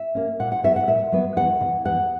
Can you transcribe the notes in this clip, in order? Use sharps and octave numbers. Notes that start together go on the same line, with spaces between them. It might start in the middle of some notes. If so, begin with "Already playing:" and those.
Already playing: E5
A#3 C#4
A#2 F#5
F#5
F#3 B3 E5
F#5
A#2 E5
F#3 B3
E2 F#5
C#3
E3
E2 F#5